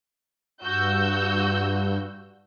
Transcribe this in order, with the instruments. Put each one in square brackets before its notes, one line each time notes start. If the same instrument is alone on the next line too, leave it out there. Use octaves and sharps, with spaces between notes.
[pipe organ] G2 [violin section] F#4 E6 G6